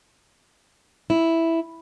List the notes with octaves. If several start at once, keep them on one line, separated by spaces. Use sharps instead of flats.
E4